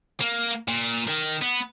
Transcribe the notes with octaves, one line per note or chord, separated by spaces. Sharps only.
A#3
A#2
D#3
B3